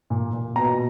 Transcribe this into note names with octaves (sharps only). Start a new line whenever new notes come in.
A#2
A#2
B2 A#5